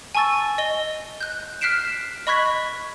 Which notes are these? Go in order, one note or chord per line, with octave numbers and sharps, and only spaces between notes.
G#5 A5 C#6 E6 A6
D#5 G7
F#6 G6
F6 F#6 B6 C7 D7 E7
D#5 B5 C#6 F#6 G#6 B6